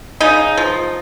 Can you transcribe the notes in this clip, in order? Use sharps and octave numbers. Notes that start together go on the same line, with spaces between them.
C#3 D#4
F3